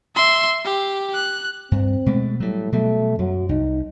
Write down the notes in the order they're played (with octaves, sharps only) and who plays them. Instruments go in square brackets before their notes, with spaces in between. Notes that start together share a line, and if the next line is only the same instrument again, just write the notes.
[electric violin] E5 C6
G4
F#6
[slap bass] G2 [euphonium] C4
[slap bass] B2 G#3 A3
[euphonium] A2 [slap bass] F#3 G3
[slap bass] B2 F#3 G3 [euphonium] A3
[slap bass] F#2 [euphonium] F#3
[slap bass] C2 [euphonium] D#4